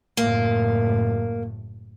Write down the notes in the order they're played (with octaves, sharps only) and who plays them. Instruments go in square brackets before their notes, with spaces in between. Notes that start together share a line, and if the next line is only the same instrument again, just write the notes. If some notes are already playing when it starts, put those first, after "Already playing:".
[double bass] F#1 A2 [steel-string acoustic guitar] A#3